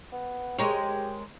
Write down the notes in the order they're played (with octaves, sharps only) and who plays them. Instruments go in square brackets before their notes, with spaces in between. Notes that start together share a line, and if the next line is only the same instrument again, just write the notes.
[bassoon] B3
[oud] G#3 A#4 C#5 [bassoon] G4